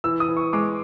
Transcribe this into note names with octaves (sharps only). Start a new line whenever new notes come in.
E3 E6
D#6
E3
C#6
G#3 D6